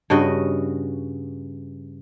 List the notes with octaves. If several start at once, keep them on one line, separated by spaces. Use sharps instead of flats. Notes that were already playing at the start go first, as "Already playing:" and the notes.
G2 C#3 F#4 D#5